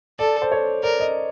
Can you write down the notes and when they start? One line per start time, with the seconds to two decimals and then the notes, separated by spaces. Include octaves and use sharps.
0.19 A4 D5
0.42 C5
0.52 C#5
0.83 A#4 D5
1.00 D#5